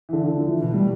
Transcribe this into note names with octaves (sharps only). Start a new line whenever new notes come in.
E3
D3
D3
F3
E3
B2
G3